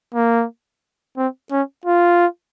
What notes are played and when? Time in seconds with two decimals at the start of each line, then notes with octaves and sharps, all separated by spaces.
0.15 A#3
1.17 C4
1.52 C#4
1.86 F4